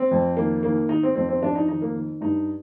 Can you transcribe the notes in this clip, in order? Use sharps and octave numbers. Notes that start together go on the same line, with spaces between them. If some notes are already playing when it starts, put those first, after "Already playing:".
Already playing: C4
F2
D#3 A#3
D#3 A#3
D#3 D#4
C4
F2 C4
C4
F2 D4
D#4
D#3 D#4
A#3
D#3
G2 D#4